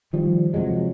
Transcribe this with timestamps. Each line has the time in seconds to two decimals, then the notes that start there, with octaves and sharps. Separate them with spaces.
0.13 D#3 F3 G3
0.54 C3 F3 F#3 G#3